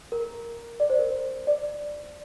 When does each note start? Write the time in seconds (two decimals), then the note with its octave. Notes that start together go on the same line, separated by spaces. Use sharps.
0.12 A#4
0.80 D5
0.90 C5
0.99 A#4
1.09 C5
1.47 D5